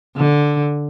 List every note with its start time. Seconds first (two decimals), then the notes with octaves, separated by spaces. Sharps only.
0.17 D3